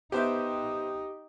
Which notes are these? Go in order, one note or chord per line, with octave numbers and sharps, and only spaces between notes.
B3 D#4 G4 C5 E5